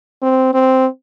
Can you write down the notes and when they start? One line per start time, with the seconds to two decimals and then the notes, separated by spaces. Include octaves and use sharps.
0.22 C4
0.54 C4